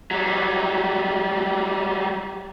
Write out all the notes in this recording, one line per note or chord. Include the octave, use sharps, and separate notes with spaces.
F#3 G3